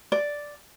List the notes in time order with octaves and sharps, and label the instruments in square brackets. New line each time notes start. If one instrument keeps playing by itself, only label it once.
[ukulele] D5